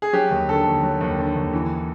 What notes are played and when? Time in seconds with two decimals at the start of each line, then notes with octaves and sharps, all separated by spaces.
0.02 G#4
0.13 F#3 G4
0.31 D#2
0.49 D3 A4
0.65 D#2
0.83 F#3
1.01 D#2
1.19 D3
1.36 D#2
1.53 E3